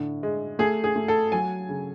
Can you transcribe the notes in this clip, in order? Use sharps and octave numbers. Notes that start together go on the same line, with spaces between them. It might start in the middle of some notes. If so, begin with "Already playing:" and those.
Already playing: A2 D3
G#3
A3 G#4
G#4
A3
A4
F#3 G#5
C#3